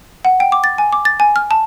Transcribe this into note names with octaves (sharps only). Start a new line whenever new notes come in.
F#5
G5
D6
A6
G#5
D6
A6
G#5
F6
A5